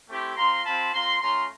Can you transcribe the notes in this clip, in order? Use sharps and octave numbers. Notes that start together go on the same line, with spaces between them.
A3 C4 E4 G4
C4 F4 A#5 C6
C4 F4 A5 B5
C4 F4 A#5 C6
A3 C#4 F4 A#5 C6